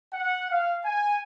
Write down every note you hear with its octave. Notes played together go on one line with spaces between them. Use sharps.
F#5
F5
G#5